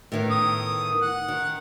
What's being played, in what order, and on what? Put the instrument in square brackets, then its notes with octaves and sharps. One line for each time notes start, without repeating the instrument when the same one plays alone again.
[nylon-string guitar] A2 D#3 B3
[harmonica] D#6
F#5
[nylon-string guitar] D#3